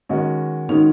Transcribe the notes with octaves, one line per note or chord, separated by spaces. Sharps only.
D#3 G#3 C#4 F#4
D#3 G#3 C#4 D#4 F#4